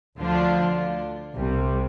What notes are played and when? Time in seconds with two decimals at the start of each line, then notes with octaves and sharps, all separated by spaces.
0.18 D2 D3 F3 D4 F4
1.36 C2 C3 G3